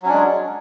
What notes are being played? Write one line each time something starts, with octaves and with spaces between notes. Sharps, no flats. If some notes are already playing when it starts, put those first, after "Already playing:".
F#3 G#3 C#4 D4